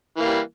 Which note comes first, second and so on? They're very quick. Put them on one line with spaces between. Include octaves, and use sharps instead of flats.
E3 A#3 G3